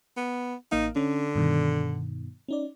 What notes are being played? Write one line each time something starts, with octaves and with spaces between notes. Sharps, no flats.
B3
A1 A#3 D#4 F5
D3 C#4
G2 B2 D#3
C#4 D#4 D5